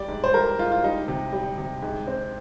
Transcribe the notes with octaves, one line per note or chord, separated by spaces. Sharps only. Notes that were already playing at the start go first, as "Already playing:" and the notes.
Already playing: G3 D5
G#2
C5
G3 A#4
G#2 F4
F4
G3 D#4
C3
G3
C3
G#2
C4